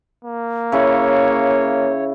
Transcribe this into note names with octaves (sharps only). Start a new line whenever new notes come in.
A#3
C#3 E4 C#5